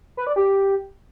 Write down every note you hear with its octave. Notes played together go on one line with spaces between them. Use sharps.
B4
D5
G4